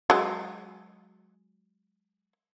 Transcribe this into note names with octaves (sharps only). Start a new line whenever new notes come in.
F#3 G#3